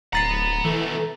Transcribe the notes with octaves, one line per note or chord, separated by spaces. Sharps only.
D1 F#5 A#5 B5 A6 C7
B2 E3 A3 A4